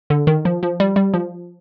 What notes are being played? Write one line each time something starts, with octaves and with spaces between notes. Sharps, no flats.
D3
D#3
F3
F3
G3
G3
F3